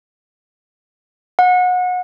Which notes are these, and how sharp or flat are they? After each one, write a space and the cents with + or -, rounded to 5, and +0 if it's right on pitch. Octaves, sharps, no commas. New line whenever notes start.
F#5 -30